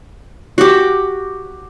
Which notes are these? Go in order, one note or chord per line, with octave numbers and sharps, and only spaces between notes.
F#4 G4